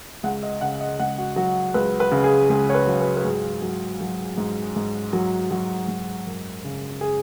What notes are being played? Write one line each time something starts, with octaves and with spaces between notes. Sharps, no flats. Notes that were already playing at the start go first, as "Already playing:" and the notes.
C#2 F#5
D#5
C#3 F#5
D#5
C#2 F#5
F#4
F#3 F#4
C#2 B4
B4
C#3
G#4
C#2 G#4
C#5
B4
F#3
B4
B4
G#2 G#4
F#3
F#3
G#2
G#2
F#3
F#3 F#4
G#2
F#2
C#3
G#4